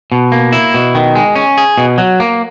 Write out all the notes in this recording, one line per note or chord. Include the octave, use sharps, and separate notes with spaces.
B2
A#3
E4
B2
D#3
G#3
C#4
G#4
B2
F#3
A#3